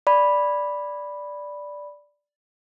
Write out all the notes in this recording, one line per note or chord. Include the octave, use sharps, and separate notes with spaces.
D5 B5